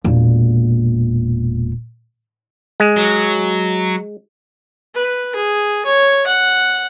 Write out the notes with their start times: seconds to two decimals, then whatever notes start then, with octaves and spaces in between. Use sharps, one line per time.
0.04 E1 A#2
2.80 G#3
2.97 F#3
4.95 B4
5.35 G#4
5.86 C#5
6.27 F#5